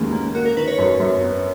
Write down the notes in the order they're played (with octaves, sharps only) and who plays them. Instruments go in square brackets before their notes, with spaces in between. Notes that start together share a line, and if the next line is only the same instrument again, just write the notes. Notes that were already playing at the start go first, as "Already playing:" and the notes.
Already playing: [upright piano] D#2 C#3 F#3 [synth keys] G#3 A#3 B3
[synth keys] A#3 [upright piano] C#4
[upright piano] A#3 [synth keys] F#4
[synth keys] A#4
[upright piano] D#3 [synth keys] B4
[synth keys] C#5
[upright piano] F#2
F#2
B3